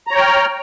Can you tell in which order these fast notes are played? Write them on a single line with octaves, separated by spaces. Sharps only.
A#5 C#5 G5 F6